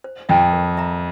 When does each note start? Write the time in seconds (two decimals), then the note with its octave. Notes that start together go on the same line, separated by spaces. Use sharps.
0.04 C5
0.29 F2 E5 G5 A#5
0.53 A#4
0.77 E5 A#5